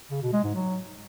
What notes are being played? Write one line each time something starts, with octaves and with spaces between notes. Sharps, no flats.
C#3
B2
G#3
G#2
F#3